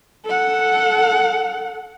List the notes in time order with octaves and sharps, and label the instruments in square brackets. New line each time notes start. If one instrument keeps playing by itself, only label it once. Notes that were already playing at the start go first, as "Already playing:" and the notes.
[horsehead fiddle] A4 F#5